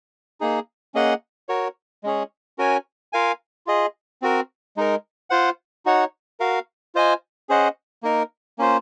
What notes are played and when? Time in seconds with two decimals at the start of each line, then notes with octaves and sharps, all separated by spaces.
0.40 A#3 D#4 G#4
0.94 A#3 C#4 G#4 D#5 F#5
1.49 F#4 A#4 C#5
2.04 G#3 C#4 G#4 C#5
2.58 C#4 F#4 A#4 C#5 G#5
3.13 F4 A#4 F5 G#5
3.67 F4 G#4 D#5
4.22 C4 F#4 A#4
4.77 G#3 D#4 A#4
5.30 F4 C5 F#5
5.86 D#4 F#4 C#5 F#5
6.40 F#4 A#4 F5
6.95 F4 C5 D#5 G#5
7.49 C#4 G#4 C5 D#5 F#5
8.03 A#3 D#4 A#4
8.58 A#3 C#4 F4 C5